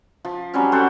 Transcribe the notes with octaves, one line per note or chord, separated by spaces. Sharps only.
F3
F#3 G3 C4 C#4
C4 F#4 A4 C5